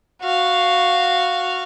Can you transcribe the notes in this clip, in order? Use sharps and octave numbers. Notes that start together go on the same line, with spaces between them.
F#4 F5